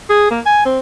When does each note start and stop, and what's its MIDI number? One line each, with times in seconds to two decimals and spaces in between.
0.10 0.26 68
0.30 0.40 58
0.46 0.65 80
0.66 0.80 60